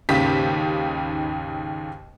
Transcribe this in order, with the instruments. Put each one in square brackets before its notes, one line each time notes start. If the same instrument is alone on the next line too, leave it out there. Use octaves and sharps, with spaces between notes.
[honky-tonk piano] D#2 G#2 C#3 G4 B6